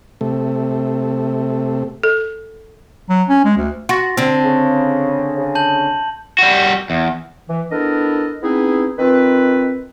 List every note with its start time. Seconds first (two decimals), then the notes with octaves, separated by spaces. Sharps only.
0.21 C3 A3
2.04 A4
3.09 F#3
3.29 C#4
3.44 G#3
3.57 D2
3.89 F#4 C6 A6 A#6
4.17 D3 C4
4.43 C#3
5.37 C#3
5.55 A5 G6 F#7
6.39 G3 F#4
6.90 E2
7.50 E3
7.71 B3 D4 E4 A4 A#4 D#5
8.43 B3 C4 D#4 E4 G#4 B4
8.99 D#3 C4 F4 B4